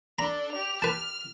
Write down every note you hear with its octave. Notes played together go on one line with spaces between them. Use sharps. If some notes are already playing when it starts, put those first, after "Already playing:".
D4 A4 A#5 B5
G4 F7
B4 A5 F6